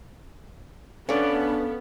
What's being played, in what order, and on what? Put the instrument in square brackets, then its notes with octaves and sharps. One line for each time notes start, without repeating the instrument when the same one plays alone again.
[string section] B3 [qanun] C#4 D5 [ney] D4 [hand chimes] A4 F5